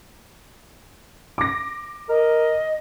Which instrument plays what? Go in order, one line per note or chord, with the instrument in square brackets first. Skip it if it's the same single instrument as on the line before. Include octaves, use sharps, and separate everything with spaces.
[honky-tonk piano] D6 A#6
[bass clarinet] A#4 [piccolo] D#5